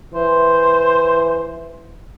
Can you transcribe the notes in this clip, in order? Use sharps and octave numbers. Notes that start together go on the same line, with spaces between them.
E3 C5